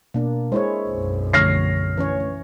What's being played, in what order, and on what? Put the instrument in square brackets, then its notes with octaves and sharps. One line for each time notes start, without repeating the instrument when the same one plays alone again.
[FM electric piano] B2 [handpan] A#3 D4
[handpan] G#3 E4 C#5 [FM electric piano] C5
[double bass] B1 F#2
[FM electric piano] D3 F3 A3 [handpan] C#5 [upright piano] F6 A#6 C7
[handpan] E3 C#4 C#5